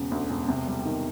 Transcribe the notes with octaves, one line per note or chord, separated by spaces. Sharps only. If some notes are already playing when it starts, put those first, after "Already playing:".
Already playing: E1 C#3
D2
E1
C3
G3
D#3